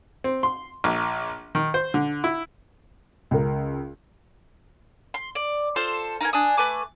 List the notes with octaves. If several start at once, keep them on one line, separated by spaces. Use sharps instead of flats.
C4
C6
A#1
D#3
C5
D3
E4
C#2 C#3 A#4
C6
D5
F4 A4 C5 C6
D#4 A#4 B4 G#5
D4 G#5 D#6
A3 B4 G#5 D6